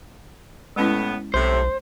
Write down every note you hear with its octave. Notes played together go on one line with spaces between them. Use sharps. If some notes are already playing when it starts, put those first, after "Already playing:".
A2 G#3 B3 C#4 E4
B1 A2 C3 C5